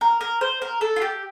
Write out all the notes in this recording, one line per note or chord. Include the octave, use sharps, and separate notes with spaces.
A#4
A#4
C5
A#4
A4
F4
G4